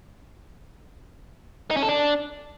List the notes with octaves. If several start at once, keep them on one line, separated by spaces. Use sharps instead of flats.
D#4
C#4
A4
D4